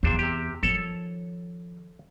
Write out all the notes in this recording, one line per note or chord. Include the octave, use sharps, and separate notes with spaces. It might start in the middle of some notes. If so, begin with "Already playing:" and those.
E2 A#2 D4 C5
C3 G4
D#3 F3 A4 C#5